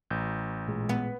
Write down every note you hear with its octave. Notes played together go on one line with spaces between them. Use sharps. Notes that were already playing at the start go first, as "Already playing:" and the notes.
A1 G6
A#2 G#3 G#4
B3